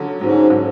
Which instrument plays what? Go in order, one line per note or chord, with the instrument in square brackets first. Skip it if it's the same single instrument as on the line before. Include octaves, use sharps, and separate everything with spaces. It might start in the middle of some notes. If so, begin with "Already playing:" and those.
Already playing: [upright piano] D3 F#3 C#4
[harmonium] G#2 [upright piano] F#3 C#4
[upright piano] D3